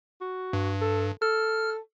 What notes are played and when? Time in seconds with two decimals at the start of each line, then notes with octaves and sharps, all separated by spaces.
0.21 F#4
0.53 G2
0.81 A4
1.22 A4 F6